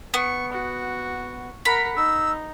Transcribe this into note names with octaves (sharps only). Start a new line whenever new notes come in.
B3 C#6
F#4
A#4 F#5 B5
D#4 E6